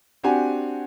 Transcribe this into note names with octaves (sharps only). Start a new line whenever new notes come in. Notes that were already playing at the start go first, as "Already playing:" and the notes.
C4 D4 F#4 G4 F#5 G#5